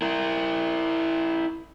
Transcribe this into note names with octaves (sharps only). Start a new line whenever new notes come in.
E4 A#4